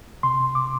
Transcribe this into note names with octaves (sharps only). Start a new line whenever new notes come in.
C3 C6
D6